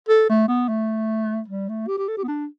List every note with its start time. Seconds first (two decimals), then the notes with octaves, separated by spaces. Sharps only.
0.09 A4
0.29 A3
0.48 B3
0.69 A3
1.48 G3
1.69 A3
1.88 G4
1.98 G4
2.08 A4
2.17 G4
2.23 B3
2.28 D4